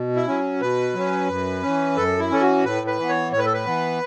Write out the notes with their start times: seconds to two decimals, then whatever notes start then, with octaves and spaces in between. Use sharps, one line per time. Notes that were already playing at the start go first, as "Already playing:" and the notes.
Already playing: B2
0.16 E4
0.28 F#3 C#4
0.61 B2 B4
0.95 F#3 C#4
1.29 F#2
1.62 E3 C#4
1.97 F#2 A4
2.19 E4
2.30 E3 C#4 A4
2.41 F#4
2.64 A2 B4
2.87 B4
2.99 E3 B3
3.09 C#5
3.32 A2 C#5
3.39 B4
3.46 A4
3.54 B4
3.66 E3 B3